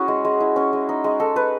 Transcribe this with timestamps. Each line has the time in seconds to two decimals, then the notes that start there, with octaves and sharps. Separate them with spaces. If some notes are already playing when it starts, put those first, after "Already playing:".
Already playing: C#4 E4 F#4 G#4 C#5
0.08 G#3
0.25 G#3
0.40 E4
0.56 C#4
0.73 G#3
0.89 D#4
1.04 G#3
1.20 D#4 A4
1.35 G#3 B4